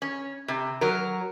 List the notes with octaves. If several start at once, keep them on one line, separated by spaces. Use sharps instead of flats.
C#4
C3
F#3 A#4